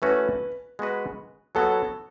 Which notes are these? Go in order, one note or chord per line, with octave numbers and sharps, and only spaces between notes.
E3 A3 C#4 F#4 B4
G#3 B3 F#4 B4
F#3 B3 F#4 A4 C#5